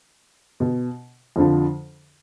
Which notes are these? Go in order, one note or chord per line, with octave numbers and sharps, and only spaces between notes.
B2
F2 D3 F3